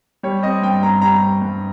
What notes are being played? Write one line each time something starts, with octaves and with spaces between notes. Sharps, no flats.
G3 C#5
C4 D#5
G2 G5
G2 A#5
G3 A#5
C4
G2